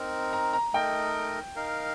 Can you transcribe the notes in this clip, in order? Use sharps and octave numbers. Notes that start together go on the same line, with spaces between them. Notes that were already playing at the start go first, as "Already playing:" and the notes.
Already playing: C4 D#4 A#4
A#5
A#5
A3 D#4 A#4 D#5 G5
D#4 A#4 F5